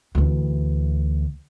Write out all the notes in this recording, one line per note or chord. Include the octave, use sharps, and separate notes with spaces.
D2 E3